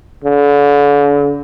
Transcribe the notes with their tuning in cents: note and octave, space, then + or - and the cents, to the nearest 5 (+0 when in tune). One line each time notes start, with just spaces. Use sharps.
D3 -40